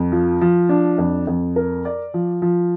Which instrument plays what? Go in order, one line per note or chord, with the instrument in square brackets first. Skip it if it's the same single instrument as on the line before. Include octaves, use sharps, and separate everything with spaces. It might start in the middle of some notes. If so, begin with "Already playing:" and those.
Already playing: [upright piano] F2
F3
F3
D4
F2
F2
A#4
D5
F3
F3